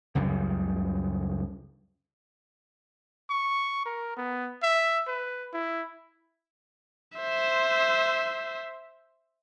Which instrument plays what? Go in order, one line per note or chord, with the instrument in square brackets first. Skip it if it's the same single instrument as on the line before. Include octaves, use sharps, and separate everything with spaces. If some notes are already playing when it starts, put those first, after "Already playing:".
[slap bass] C#2 F#2 C#3 G3
[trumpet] C#6
A#4
B3
E5
B4
E4
[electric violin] C5 E5